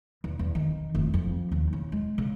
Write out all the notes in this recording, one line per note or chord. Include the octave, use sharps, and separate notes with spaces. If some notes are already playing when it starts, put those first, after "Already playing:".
E2
E2
D#3
F1
F2
D#2
C#3
G#3
C#3